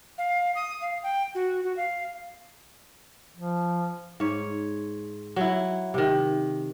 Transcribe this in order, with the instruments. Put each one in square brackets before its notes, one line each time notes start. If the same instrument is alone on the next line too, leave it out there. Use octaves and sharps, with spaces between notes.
[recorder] F5
D#6
F5
G5
F#4
F#4
F5
[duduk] F3
[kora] G#2 C#5
F#3 E4
C3 D#3